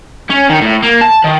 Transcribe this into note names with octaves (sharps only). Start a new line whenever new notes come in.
C#4
D#3
A2
A#3
A5
D#3